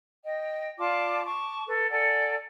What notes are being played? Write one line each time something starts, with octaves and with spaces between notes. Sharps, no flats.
D#5 G5
F4 D5 A5 D6
A5 C#6 D6
A4 B4
A4 D5 F#5 G#5